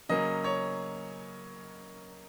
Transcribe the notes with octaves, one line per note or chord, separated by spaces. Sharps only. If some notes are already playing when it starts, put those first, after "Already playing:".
C#3 F#3 A#3 C#4 D#5
C#5